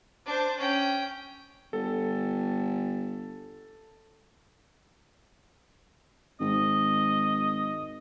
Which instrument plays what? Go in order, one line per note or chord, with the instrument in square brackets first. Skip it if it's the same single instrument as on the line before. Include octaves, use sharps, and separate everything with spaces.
[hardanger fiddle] D4 C5
C#4 G5
[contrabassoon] G1 [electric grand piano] A4
[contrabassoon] G#1 [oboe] D#5